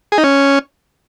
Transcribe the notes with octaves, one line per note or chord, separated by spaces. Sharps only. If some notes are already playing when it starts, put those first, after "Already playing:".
G#4
D#4
C#4